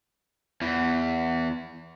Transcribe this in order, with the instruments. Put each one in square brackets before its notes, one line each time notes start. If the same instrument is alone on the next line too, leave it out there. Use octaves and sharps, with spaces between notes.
[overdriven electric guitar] E2 E3